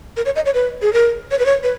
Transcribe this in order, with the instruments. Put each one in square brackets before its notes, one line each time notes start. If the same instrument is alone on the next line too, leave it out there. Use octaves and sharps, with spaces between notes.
[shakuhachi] A#4
C#5
D#5
C#5
B4
G#4
A#4
C#5
B4
C#5
B4